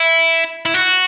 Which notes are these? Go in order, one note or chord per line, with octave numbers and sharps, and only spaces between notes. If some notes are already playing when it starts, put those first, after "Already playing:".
Already playing: E4
E4
F#4